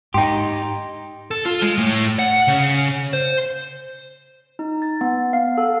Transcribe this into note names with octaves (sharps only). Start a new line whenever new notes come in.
G#2 D#4 G4 G5 C6
A4
F4
G#3
A2
F#5
C#3
C5
D#4
A6
B3
F5
A4